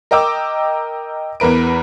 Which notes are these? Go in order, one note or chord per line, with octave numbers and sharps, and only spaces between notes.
A#4 D#5 G5 A#5 D6 E6
E2 E3 A#4 B4 D7